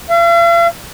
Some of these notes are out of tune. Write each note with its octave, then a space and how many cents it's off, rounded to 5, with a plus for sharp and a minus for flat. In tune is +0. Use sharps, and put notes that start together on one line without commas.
F5 -45